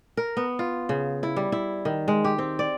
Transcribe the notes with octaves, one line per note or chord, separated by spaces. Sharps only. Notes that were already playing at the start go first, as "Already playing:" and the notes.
A#4
B3
F4
C#3
E4
G3
E4
D#3
G#3
G4
C4
D5